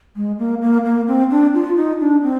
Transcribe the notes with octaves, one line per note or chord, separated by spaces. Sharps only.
G#3
A#3
A#3
A#3
C4
D4
F4
D#4
D4
C4